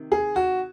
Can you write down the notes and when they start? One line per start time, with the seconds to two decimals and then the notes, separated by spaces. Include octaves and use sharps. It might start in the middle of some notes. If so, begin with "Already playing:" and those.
Already playing: C3 D#3
0.12 G#4
0.36 F#4